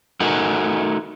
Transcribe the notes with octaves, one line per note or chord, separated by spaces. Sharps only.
A3 D#4 F#4 G#4 A#4 F#5